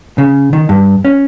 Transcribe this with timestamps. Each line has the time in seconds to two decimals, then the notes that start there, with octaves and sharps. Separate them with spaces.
0.18 C#3
0.53 D#3
0.69 G2
1.05 C#4